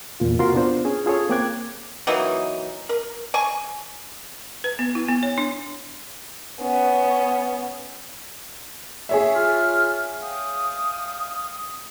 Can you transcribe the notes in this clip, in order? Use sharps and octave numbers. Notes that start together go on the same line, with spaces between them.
E2 A#2 F4
C3 F4 F#4 A#4 C6
B3 D4 F4 C5
C#4 G#4
F4 G#4 A4 C#5
A#3 C4 G5 D6 F#6 G#6
E3 F#3 A#3 D#4
A#4
G#5 C#6
B4
B3
E4
B3
C#5
D4
B3 C#4
G#4 C#5 E5
F4 F6
F5 G5 D#6